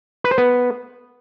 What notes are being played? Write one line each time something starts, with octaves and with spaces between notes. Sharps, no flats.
B4
C5
B3